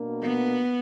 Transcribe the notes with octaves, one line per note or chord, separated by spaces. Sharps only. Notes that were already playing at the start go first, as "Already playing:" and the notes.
Already playing: B2 A#3 D4
B3